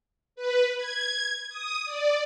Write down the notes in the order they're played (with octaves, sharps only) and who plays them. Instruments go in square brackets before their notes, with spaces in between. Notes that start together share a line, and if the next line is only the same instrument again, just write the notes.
[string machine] B4
G#6
D#6
D5